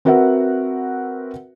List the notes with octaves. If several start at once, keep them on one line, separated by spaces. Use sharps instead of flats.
C4 F#4 A#4 B4 E5 F#5